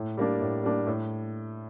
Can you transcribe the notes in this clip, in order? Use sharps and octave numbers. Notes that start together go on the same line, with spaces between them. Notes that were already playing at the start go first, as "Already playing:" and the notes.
Already playing: A2
G3 A#3 D4
A2
G3 A#3 D4
A2